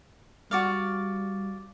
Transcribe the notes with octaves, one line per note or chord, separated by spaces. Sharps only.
G3 F#4 D5 F5